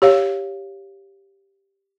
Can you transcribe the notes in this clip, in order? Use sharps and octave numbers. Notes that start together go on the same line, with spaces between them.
G4 C#5 F5